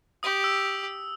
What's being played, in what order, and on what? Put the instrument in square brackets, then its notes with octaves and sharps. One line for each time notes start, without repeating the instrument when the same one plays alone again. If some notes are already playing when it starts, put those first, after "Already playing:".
[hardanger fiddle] G4 [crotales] D#6
[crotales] E6